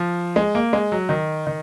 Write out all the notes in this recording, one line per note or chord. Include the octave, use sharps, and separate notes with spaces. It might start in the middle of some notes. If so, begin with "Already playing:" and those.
Already playing: F3
G#3
A#3
G#3
F#3
D#3
D#3